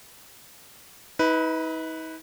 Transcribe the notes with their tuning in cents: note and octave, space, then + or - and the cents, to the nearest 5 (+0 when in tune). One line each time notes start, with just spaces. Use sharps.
D#4 +45 B4 +0